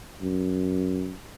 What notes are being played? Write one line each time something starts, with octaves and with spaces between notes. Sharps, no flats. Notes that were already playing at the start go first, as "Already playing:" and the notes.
F#2